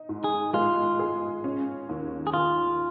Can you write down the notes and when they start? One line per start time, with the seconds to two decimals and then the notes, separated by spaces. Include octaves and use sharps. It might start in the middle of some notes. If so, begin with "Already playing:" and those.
Already playing: D#4
0.09 G#2
0.24 G#4
0.54 G#3 F4
0.99 G#4
1.44 C#4
1.89 D#2
2.27 G#4
2.33 D#3 F4